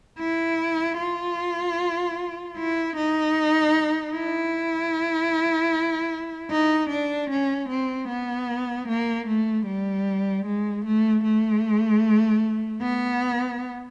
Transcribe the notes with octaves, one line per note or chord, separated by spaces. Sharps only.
E4
F4
E4
D#4
E4
D#4
D4
C#4
C4
B3
A#3
A3
G3
G#3
A3
A3
B3